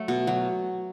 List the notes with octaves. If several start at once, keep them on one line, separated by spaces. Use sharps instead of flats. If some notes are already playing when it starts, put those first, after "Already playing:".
Already playing: F#3 A3
B2
F#3